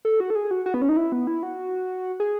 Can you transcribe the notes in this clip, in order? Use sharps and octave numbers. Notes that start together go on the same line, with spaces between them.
A4
F#4
A4
G#4
F#4
F#4
B3
C#4
D#4
E4
B3
E4
F#4
G#4